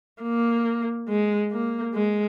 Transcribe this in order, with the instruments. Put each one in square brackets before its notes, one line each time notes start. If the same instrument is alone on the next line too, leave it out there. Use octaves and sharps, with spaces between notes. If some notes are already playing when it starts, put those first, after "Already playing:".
[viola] A#3
G#3
A#3
G#3